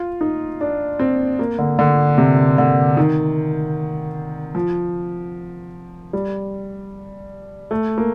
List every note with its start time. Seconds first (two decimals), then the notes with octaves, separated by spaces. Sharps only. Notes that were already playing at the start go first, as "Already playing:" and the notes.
Already playing: F4
0.21 D#4
0.61 D4
0.99 C4
1.39 A#3
1.59 D3
1.79 D3
2.18 C3
2.58 D3
2.97 D#3
4.55 F3
6.13 G3
7.71 A3
7.98 A#3